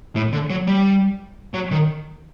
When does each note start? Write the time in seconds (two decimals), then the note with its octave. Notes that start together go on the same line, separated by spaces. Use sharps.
0.16 A2
0.33 D3
0.50 F#3
0.68 G3
1.54 F#3
1.72 D#3